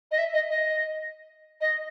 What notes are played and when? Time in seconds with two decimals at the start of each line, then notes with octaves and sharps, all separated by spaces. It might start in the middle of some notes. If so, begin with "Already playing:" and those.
0.11 D#5
0.18 E5
0.34 D#5
0.50 D#5
1.61 D#5